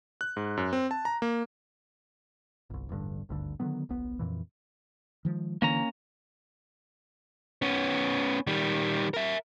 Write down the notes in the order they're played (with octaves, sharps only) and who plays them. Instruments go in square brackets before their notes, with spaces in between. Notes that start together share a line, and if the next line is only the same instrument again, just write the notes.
[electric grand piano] F#6
G#2
F#2
C4
A5
A#5
A#3
[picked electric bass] G1 C2
E1 A1 G2 D3
G#1 D2 G2 D3
D3 D#3 F#3 B3
D1 A#1 B3
F2 A#2 E3
[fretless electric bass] D#3 F3 G#3
[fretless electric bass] D3 E3 [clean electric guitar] A#3 C#4 A#5
[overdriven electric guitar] B3 C#4
D#3 G3
A#4 E5